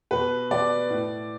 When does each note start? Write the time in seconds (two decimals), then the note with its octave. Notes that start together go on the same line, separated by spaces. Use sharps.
0.11 B2 B4
0.51 B2 D5
0.90 A2